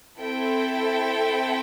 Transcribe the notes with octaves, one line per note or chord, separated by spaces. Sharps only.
C4 E4 A4 E5 G5